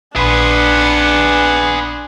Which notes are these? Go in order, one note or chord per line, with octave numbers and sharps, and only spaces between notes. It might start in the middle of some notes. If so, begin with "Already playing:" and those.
A#1 B3 D4 G#4 B4 C6